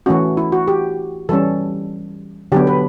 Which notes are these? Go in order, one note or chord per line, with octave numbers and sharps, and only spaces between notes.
E3 A3 C#4 F#4
E4
F#4
G4
E3 G3 C#4 A4
D3 F#3 B3 G4
B4